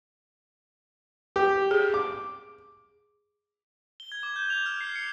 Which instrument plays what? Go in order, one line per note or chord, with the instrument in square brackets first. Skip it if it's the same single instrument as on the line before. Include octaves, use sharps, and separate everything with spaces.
[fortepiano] G4
[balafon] G#4
[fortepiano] D6
[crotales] G7
G#6
D6
G6
F7
F6
C7
C#7